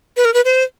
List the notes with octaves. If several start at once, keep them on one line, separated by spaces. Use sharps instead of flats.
B4
A#4
B4
C5